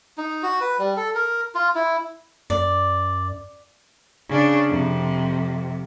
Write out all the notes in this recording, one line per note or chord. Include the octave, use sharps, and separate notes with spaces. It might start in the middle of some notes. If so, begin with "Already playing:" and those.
D#4
F#4
B4
G3
A4
A#4
F4
E4
F#2 D5
C#3 D4
F2 C3